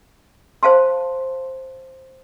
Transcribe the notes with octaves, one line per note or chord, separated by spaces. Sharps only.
C5 F5 A5 C6